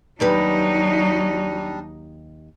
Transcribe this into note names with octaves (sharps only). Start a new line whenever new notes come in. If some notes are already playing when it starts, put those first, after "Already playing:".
D#2 F#3 G3 D4 D#4 G4 B4